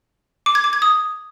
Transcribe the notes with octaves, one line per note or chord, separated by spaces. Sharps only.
D6
G#6
D6
G#6
D#6